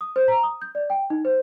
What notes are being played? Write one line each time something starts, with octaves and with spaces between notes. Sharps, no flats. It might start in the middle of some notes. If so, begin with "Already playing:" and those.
D#6
C5
A#5
D#6
G6
D5
G5
D#4
C5